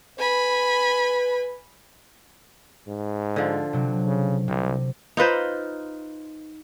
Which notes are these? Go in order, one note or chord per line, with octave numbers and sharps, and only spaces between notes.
B4 G#5 B5
G#2
D3 F3
C3 F#3
C#3
C2 C3
D#4 F4 B4 C5